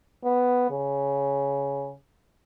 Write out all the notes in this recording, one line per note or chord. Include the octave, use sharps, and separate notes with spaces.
B3
C#3